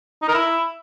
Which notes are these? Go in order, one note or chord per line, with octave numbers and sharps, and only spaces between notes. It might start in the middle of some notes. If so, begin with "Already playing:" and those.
D#4
A#4
E4